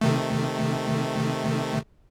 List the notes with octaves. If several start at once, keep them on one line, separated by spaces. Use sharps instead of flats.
C3 D#3 A3